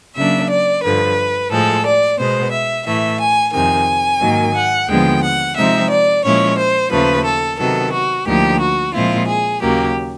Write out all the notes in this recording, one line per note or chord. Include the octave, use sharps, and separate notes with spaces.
C#3 F#3 A#3 D4 E5
D5
G2 D3 F3 B4
A2 F3 G#3 A4
D5
B2 G#3 B3 C5
E5
A2 E3 A3 E5
G#5
F2 C3 D#3 G#5
G#2 D#3 F#3 A#3
F#5
D#2 D3 F3 G#3 B3 G5
F#5
C3 F3 G#3 C4 D#4 E5
D5
A#2 F3 G#3 C#4 E4 C#5
C5
D#2 C#3 F3 A3 B4
A4
C3 D#3 F#3 B3 A4
F#4
D2 D3 F3 A#3 D#4 G4
F#4
A#2 F3 G#3 C4 E4 F4
G#4
D#2 C#3 F#3 A#3 G4